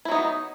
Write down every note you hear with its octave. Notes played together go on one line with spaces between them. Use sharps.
F#3 B3 D#4 E4